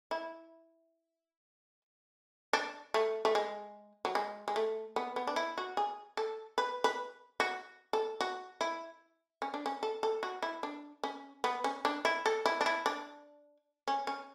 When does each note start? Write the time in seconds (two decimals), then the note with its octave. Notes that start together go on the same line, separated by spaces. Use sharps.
0.11 E4
2.53 D4
2.94 A3
3.25 A3
3.35 G#3
4.05 F#3
4.15 G#3
4.48 G#3
4.56 A3
4.96 B3
5.16 B3
5.27 D4
5.36 E4
5.58 F#4
5.77 G#4
6.17 A4
6.58 B4
6.84 B4
7.40 F#4
7.93 A4
8.21 F#4
8.61 E4
9.42 C#4
9.54 D4
9.66 C#4
9.83 A4
10.03 A4
10.23 F#4
10.42 E4
10.63 D4
11.03 C#4
11.44 B3
11.64 C#4
11.85 D4
12.05 E4
12.26 A4
12.46 E4
12.61 D4
12.66 E4
12.86 D4
13.88 C#4
14.07 C#4